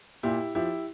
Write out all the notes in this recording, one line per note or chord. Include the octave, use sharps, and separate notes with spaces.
A#2 E4 G4
F3 E4 G4